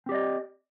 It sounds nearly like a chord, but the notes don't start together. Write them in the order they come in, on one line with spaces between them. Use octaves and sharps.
C4 G4 D5 D#5